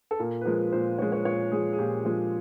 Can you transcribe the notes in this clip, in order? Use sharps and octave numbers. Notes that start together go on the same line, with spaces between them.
A4
A#2 A#4
B4
F3 G#3 A#4
A#2 C5
F3 G#3 C#5
C#5
A#2 C#5
F3 G#3 G#4
G#4
A#2 G4
F3 G#3